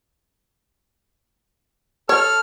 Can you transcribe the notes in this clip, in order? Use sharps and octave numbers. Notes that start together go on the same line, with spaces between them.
A4 C#5 F6